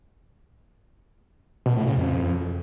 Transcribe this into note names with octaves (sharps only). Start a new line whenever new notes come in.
B2
A2
C#3
F2